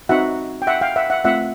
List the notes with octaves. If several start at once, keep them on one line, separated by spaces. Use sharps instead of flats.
C4 D#4 F#4 E5 F#5
G5
E5 F#5
F5 G5
E5 F#5
E5 F#5
A3 C4 F4 E5 F#5